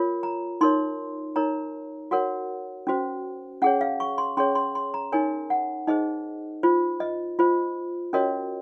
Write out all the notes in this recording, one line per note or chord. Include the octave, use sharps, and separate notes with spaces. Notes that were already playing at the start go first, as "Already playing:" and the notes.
Already playing: F4 A#4 C#5
A#5
D#4 A#4 C#5 C6
D#4 A#4 C#5 A#5
F#4 A#4 C#5 F#5
C#4 F#4 C5
C#4 G#4 C#5 F#5
F5
C#6
C6
C#4 G#4 C#5 C6
C6
C6
A#5
D#4 A#4 C#5 G#5
F#5
D#4 G#4 C5 D#5
F4 C5
D#5
F4 C5
C#4 F#4 A#4 C#5 D#5